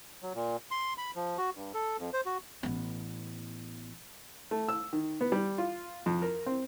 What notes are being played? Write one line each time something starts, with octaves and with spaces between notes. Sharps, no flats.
F#3
A#2
C6
B5
F3
F#4
G2
A4
F2
C5
F#4
A1 B3
A3
E6
D#3
B3
G3
F4
F2
A#4
C4